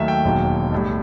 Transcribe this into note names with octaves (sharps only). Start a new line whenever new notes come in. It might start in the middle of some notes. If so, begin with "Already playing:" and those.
Already playing: D#2 D#3 F#3 A3 E5
G5
E1 D#2 D#3 F#3
B1 A2 G3